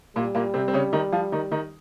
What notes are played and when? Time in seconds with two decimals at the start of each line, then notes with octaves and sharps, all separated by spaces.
0.16 A#2 G3 A#3
0.35 A#2 A#3
0.54 C3 C4
0.68 C4
0.74 C#3 C#4
0.93 D#3 D#4
1.12 F3 F4
1.32 D#3 D#4
1.51 D#3 D#4